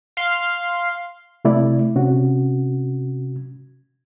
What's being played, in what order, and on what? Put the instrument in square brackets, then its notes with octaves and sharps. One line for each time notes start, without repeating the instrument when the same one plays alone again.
[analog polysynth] F5 C6
[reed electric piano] C3 A3 E4 D5
C3 C#4 F#4